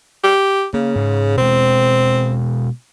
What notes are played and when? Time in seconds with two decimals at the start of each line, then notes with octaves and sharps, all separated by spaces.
0.24 G4
0.74 C#3 A#3
0.96 G#2
1.38 B2 G#3 C4